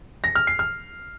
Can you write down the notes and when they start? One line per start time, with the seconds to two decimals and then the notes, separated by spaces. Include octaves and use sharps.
0.24 A#6
0.35 F6
0.47 C7
0.59 F6